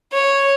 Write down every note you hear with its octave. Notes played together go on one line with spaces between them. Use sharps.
C#5